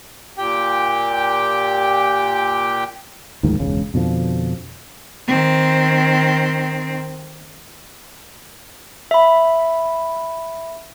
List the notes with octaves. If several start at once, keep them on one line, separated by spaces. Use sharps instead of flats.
A#2 G4 G5
D2 G#2 D#3 F3
E1 C#2 C#3
F2 B2 D3 F3
D#3 C4
E5 B5